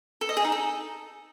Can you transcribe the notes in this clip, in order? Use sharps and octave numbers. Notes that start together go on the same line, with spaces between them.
A4
D#5
G#4
D#4
A4